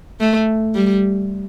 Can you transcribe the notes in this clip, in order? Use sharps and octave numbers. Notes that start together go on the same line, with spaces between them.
A3
G3